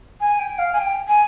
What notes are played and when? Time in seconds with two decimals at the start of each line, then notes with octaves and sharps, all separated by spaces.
0.20 G#5
0.38 G5
0.58 F5
0.72 G#5
0.78 G5
1.07 G#5